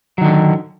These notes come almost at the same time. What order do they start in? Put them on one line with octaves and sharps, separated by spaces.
F#3 D#3 D3